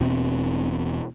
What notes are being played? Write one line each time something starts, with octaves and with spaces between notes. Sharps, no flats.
E1 B2 C4